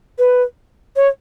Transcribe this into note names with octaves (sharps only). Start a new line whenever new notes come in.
B4
C#5